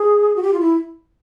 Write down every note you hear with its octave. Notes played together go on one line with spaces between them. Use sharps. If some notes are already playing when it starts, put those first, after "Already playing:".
Already playing: G#4
F#4
G4
F4
E4